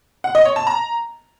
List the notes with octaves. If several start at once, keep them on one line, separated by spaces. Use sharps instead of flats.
F#5
D#5
C#5
A5
A#5